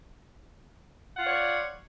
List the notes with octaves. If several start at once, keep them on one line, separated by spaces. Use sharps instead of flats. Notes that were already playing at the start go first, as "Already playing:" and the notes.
F4 C#5 D5 F#5